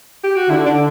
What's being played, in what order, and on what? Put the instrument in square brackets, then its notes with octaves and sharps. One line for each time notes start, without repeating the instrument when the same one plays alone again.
[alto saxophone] G4
F#4
[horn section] D3 [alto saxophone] E4
[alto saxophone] D4